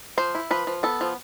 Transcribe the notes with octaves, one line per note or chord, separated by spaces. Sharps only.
F3 C5
E4
F3 B4
F3
B3 A4
F3